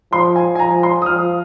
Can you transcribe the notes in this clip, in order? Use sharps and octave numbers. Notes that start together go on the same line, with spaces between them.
F3 C6
G#5
G#5
F3 A#5
C6
D#6
F3 F6